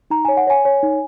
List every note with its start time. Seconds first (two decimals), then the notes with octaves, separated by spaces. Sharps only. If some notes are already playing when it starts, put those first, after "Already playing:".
0.10 D#4 A#5
0.25 C#5 G#5
0.37 F#5
0.47 C#5 G#5
0.65 C#5
0.83 D#4